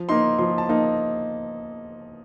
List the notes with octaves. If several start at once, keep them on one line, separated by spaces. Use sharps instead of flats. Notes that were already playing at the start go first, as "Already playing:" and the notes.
Already playing: F3
A#3 D#4 C6
F3 C6
A5
A#3 D#4